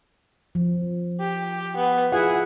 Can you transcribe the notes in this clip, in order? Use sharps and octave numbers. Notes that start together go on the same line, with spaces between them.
F3
G4
B3
E4 F4 G#4 F#5